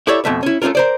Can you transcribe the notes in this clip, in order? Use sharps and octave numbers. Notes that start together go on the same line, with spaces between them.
E4 G4 A4 C#5 D5 E5
F2 B2 A3 E5
C#4 E4
A3 B3 C#4 F4 A#4
A#4 C5 D5